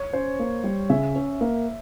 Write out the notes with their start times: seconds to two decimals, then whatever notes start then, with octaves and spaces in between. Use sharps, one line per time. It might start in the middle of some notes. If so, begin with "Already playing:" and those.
Already playing: C#5
0.13 C#4 C5
0.39 A#3
0.64 G3
0.90 C#3 E5
1.15 C#4
1.41 A#3